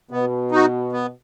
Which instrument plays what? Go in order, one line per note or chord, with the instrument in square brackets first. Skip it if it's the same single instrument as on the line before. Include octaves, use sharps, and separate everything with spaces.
[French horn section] B2 [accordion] B3
[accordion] D#4 F#4
B3